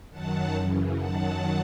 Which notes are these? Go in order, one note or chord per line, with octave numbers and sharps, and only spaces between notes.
F#2 D#3 F#3 F#5 A5
F#2 C#3 E3
F#2 D#3 F#3 F#5 A5